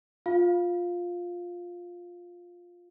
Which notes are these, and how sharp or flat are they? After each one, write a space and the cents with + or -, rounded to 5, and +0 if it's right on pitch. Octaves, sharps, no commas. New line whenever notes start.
F4 +10 F5 +0